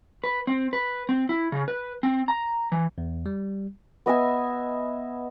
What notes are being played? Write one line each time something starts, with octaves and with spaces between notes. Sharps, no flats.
B4
C4
B4
C4
E4
C#3
B4
C4
A#5
E3
E2
G3
B3 D#5 E5 G#5